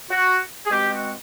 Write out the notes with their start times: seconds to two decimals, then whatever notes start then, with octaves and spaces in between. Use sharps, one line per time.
0.10 F#4
0.66 G#4
0.71 B2 G#3 C4 G4
0.91 F#4